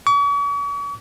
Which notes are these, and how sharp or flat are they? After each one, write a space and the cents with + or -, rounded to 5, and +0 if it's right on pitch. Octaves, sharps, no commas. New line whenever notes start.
C#6 +45